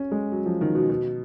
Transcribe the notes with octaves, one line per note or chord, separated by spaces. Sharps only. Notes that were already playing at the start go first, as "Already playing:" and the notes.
Already playing: C#4
G#3
F#3
F3
D#3
B2
B2